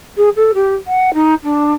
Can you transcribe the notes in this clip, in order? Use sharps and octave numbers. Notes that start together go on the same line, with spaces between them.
G#4
A4
G4
F#5
D#4
D4